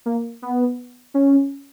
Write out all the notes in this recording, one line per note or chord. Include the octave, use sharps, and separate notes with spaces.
A#3
B3
C#4